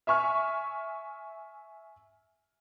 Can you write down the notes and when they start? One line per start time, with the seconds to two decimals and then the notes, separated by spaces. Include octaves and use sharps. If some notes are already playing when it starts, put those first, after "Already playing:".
0.07 E5 G#5 C#6 F6